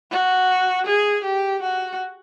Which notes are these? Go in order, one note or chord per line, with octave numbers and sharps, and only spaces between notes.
F#4
G#4
G4
F#4